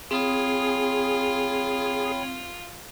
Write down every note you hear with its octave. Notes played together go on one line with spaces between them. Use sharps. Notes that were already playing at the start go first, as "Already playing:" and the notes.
C4 F4 G#4 C#5 G5 B5 D#6